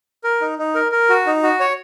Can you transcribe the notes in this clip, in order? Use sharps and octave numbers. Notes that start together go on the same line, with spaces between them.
A#4
D#4
D#4
A#4
A#4
F#4
D#4
F#4
C#5